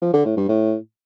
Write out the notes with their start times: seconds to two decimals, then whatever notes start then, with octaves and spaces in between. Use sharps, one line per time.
0.02 F3
0.14 D3
0.25 A2
0.37 G2
0.48 A2